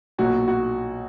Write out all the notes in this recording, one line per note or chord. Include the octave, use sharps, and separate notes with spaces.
B1 A#2 F#3 F#4
F#4